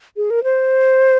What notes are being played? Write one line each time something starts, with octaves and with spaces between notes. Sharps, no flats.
G#4
A#4
C5